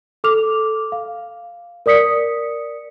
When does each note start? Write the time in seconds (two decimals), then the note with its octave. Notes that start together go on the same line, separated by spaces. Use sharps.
0.24 A4 D6 F6 F7
0.92 F5
1.86 A#4 D5 D#6 B6 C#7